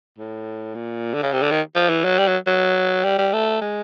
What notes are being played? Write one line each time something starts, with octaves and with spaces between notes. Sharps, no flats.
A2
A#2
D3
C#3
C3
D3
D#3
F3
E3
F#3
G3
F#3
F#3
G3
G3
A3
G#3